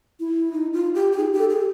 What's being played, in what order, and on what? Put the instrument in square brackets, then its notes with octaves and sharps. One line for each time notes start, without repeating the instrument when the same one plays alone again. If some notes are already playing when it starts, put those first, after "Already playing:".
[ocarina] E4
[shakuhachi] D#4
F4
G4
G4
[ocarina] D#4 [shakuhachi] G#4
[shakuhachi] G4
[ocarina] A4
[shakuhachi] G#4